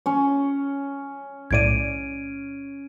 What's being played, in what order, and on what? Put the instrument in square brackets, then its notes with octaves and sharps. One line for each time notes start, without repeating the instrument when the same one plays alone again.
[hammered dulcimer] C#4 C#5
[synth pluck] B1 A2 D5 [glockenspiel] G#6 D7 D#7